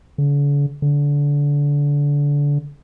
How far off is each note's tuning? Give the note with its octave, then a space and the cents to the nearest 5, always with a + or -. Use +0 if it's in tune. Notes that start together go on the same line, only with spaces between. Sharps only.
D3 -45
D3 -25